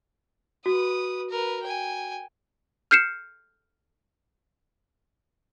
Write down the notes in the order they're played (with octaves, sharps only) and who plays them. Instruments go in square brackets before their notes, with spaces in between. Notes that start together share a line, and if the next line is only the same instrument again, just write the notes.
[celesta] F#4 [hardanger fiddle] B4 D#6
[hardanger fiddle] A#4 B4
G5 G#5
[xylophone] F6 G6 C7 C#7 E7